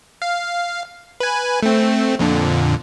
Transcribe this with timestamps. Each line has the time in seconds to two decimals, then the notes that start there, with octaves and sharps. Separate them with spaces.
0.22 F5
1.20 B4 G#5
1.63 A3 C4
2.19 F2 A#2 D3